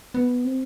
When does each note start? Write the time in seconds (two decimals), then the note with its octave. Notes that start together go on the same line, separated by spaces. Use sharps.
0.14 B3
0.45 C4